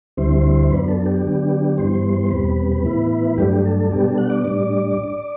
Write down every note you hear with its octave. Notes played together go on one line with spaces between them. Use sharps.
D2 D3 G3 C4 E4 C5
F#2 F#3 B3 D4 B4
A4
G4
D3 F#3 B3 D4
G2 E3 G3 B3 C5
E2 B2 G3 C4 B4
A2 E3 B3 E4
G2 F#3 A3 D4 G4
A4
B2 G3 B3 D4 G4
A4
F#5
D5
A2 G3 D4